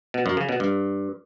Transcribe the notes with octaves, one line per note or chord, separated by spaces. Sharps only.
B2
F#2
C#3
B2
G2